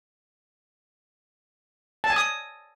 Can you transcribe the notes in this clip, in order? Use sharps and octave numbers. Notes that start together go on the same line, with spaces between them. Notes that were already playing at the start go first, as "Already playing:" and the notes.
A5
G#5
D#6